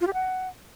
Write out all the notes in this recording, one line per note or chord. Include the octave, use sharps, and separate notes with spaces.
F4
G4
F#5